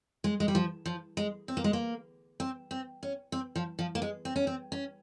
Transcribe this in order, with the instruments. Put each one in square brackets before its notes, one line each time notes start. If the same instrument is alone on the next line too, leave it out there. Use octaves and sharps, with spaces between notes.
[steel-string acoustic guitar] G#3
G#3
G3
F3
F3
G#3
C4
A#3
G#3
A#3
C4
C4
C#4
C4
F3
F3
A#3
G#3
C4
C#4
C4
C#4